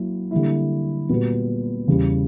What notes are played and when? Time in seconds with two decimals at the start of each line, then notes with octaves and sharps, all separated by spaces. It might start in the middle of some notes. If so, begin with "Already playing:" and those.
Already playing: F#3 A#3 E4
0.31 D3 G3 A#3 E4
1.09 A#2 G3 B3 F#4 B4
1.88 E2 C#3 G3